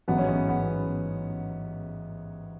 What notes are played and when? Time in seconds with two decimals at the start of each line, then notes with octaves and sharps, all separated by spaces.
0.08 A1 G#2 F#3 B3
0.18 C#4
0.29 B3
0.49 B3